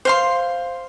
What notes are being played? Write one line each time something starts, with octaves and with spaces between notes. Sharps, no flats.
C5 F5 C6